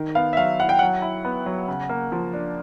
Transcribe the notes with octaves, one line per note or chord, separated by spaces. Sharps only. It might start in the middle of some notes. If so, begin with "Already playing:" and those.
Already playing: D#3
B3 F5
E5
F#3 F5
E4 F#5
G5
F#3 F#5
E4
B3
F#3
C#3
A#3
F3
D4